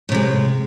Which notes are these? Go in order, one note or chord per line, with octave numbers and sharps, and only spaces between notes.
A2 C3 G#3